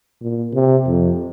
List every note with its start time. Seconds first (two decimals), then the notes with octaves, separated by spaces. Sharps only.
0.21 A#2
0.54 C3
0.87 F2